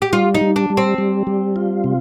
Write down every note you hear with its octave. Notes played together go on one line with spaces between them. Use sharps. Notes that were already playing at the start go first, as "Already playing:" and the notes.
G4
G3 F4
D#4
G3
D4
G3
C4
G3
G3
F4
C3